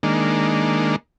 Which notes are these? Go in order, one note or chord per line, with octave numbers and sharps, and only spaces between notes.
D#3 G#3 A#3 D4